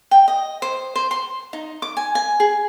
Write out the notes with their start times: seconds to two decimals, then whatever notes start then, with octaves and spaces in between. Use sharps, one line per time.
0.11 G5
0.28 D#5
0.62 C5
0.96 C5
1.11 C6
1.53 D#4
1.82 D6
1.97 G#5
2.15 G#5
2.40 G#4